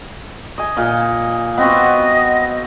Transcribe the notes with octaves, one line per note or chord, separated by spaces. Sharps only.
D#5 G#5
A#2 D#5
B3 C4 F#4 D#5